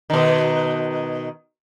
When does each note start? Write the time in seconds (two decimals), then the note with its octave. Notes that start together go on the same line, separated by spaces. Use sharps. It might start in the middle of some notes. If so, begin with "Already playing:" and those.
0.10 B2 D#3